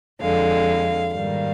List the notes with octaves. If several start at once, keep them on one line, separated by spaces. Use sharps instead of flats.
F2 D3 G#3 F5
G#2 D#3 G3 A#3 F5